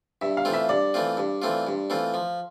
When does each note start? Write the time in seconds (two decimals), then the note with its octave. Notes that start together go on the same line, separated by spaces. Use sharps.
0.22 G2 E5
0.37 F5
0.45 E3 A3 C4 F4
0.53 E5
0.69 G2 D5
0.94 E3 A3 C4 F4
1.17 G2
1.42 E3 A3 C4 F4
1.67 G2
1.90 E3 A3 C4 F4
2.14 F3